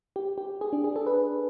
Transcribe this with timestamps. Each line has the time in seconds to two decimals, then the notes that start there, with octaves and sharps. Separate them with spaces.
0.16 G4
0.38 G4
0.61 G#4
0.73 D4
0.84 G#4
0.96 A4
1.07 B4